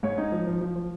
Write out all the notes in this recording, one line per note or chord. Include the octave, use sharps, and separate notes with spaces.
G#2 C#5
D#4
F3
F3
F3
F3